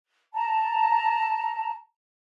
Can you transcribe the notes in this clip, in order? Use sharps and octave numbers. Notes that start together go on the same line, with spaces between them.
A5 A#5